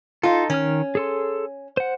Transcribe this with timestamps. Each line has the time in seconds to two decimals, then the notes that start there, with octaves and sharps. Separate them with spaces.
0.23 D#4 F4 A4
0.50 D#3 C#4 F6
0.95 G#4 A4 C6
1.77 C5 F#5